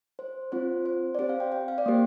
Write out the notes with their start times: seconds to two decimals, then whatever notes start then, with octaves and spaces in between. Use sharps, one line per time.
0.19 C5
0.52 C4 F4 C5
0.86 C5
1.15 D5
1.19 C4 G4 C5
1.29 F5
1.40 G5
1.52 G5
1.68 F5
1.78 D5
1.86 A#3 G4 C5